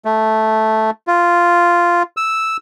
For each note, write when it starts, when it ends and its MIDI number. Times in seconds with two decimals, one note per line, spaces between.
0.05 0.91 57
1.07 2.03 65
2.17 2.57 88